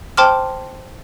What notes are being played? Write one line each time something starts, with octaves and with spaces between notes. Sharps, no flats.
C5 G5 A5 C6 D6 F6